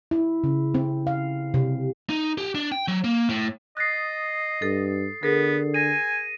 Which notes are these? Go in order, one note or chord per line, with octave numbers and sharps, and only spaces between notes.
E4
C#3
C4
F5
C3
D#4
G4
D4
G5
F#3
A#3
A2
D#5 D#6 F#6 A6 A#6 C7
G2 A4
D3 B3 G#4 A#4
G#5 A#6 D#7